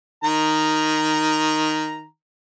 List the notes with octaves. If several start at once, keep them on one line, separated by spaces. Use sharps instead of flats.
D#3 A#5